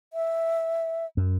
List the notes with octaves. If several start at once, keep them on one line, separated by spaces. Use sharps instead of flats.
E5
F#2